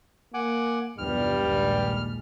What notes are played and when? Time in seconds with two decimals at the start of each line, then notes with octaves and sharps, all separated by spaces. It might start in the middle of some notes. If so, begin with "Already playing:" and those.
0.34 A#3 F#5 G#5 D6
0.98 E2 G2 C3 F3 G3 F6
1.41 A#1 D#2 G#3